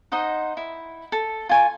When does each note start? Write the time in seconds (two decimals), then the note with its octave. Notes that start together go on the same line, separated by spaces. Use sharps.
0.12 D#4 C5 D#5 F#5
0.57 E4
1.12 A4
1.49 F4 G#5 C#6